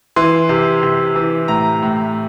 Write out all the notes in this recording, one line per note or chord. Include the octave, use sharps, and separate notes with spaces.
E3 C6
C3
C3
E3
A2 A#5
A2